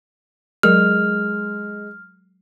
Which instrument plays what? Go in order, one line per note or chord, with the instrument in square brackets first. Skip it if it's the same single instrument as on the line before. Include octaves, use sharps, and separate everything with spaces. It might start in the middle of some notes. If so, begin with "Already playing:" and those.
[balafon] F#3 A#4 [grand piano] G#3 [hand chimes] F6